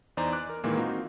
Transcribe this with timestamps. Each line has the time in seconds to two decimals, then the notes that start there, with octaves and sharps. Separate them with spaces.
0.17 E2 D#4 C5 D5 G#5 A#5
0.32 D6 F#6
0.49 A#4
0.64 A#2 D#3 E3 G#3 A#3
0.77 C4 D#4 F4 F#4